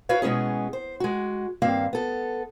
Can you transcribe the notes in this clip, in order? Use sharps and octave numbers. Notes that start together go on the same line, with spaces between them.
E4 F#4 B4 C#5 F5
B2 G#3 B3 C#4 G#4
C5
G#3 F#4
G2 D#3 A#3 C4 F5
B3 A4